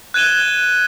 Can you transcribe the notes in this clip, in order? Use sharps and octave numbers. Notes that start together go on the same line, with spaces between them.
F#6 G#6 D#7 E7 G7